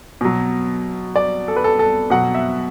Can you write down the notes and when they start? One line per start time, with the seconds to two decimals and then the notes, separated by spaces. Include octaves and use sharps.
0.21 B2 F#3
1.16 D5
1.48 A4
1.56 B4
1.64 A4
1.79 A4
2.10 B2 F#3 F#5
2.35 E5